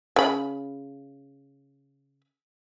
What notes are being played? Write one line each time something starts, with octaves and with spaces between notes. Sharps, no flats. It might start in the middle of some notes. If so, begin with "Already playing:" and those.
C#3 B5